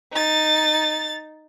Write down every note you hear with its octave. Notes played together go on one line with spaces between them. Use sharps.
D#4 A6